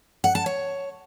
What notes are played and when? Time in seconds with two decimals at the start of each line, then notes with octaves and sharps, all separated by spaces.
0.24 F#5
0.35 A5
0.46 C#5